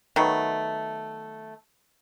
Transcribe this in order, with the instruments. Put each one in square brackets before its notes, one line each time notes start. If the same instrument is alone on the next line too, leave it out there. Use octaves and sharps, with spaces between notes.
[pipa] D#3 F#3 A3 B3